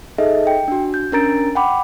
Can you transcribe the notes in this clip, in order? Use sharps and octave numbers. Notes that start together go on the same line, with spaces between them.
D#4 G#4 A4 D#5 E5
G5
D4 F#4
G6
C#4 D4 A#4 A#5 A6 D7
F#5 G5 B5 D6